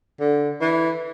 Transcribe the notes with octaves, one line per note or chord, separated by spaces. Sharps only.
D3
E3